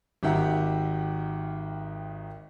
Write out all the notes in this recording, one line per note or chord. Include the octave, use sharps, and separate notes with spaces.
G#1 D#3 G4 A#4 E5 F#5